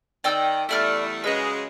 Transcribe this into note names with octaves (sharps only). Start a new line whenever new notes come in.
D#3 D5 G5 E6
E2 G3 A3 E4 D5 F6
C#3 F#3 G#3 B4 D#5